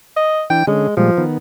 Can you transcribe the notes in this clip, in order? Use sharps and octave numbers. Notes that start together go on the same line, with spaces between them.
D#5
E3 D4 G5
D3 G#3 C#4 G#4
A#2 F3 G3 G#3
D#3 B3